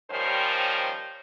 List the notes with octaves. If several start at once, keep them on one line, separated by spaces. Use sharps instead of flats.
D#3 F3 G3 C#4 A#4 C5